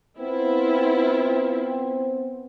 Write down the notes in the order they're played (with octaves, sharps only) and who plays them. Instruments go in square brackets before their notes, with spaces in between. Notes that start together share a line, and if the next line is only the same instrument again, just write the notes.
[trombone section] B3 C4 [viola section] E4 F4